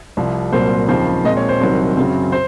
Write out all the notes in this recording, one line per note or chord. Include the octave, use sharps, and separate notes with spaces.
C2 C3 F3
C2 A#2 F#3 A#3 C5
D#2 C#3 F3 C4 C5
A#2 G#3 C4 D#5
C#5
C5
C2 C3 D#3 F#3
F#2 C#3 F#3 C4
C5